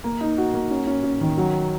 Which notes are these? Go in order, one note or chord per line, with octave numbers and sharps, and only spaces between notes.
A#3
D#4
F#4
A#3
C#4
C#4
C#4
D#3
F#3